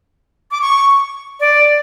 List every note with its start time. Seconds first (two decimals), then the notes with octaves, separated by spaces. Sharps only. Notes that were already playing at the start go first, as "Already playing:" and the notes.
0.51 D6
0.62 C#6
1.40 D5